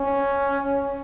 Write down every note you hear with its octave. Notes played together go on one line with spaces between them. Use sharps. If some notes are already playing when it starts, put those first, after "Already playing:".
Already playing: C#4